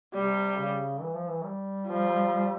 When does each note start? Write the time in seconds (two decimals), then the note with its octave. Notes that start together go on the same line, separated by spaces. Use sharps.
0.15 C3 G3
0.58 C#3
1.01 E3
1.15 F3
1.29 E3
1.44 G3
1.88 F3